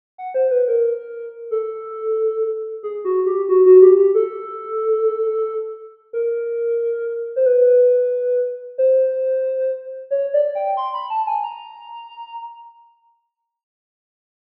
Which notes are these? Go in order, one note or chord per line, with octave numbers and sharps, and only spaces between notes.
F#5
C5
B4
A#4
A4
G#4
F#4
G4
F#4
F#4
G4
G4
A4
A#4
C5
B4
C5
C#5
D5
G5
C6
B5
A5
G#5
A#5